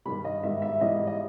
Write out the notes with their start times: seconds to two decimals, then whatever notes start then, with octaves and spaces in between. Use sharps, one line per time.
0.05 G2 D#3 G3 B5
0.24 D#5
0.43 G#2 D#3 G3 E5
0.62 E5
0.81 G#2 E3 G3 D#5
1.07 D#5